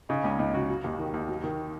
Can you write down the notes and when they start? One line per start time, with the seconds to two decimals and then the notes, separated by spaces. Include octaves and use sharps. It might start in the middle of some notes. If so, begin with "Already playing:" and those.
0.09 C#3 D#4
0.23 C#2 C#4
0.39 C#2 D#4
0.53 C#3 F#4
0.70 F#3
0.84 D#2
0.99 D#3
1.14 D#2
1.29 F#3
1.44 D#3